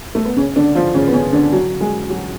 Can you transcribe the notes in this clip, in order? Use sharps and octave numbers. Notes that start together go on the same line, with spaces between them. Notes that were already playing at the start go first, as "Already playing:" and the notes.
A3
B3
C#3 C#4
D3 D4
F3 F4
C#3 C#4
B3
C#3 C#4
D3 D4
F#3 F#4
G#3 G#4
F#3 F#4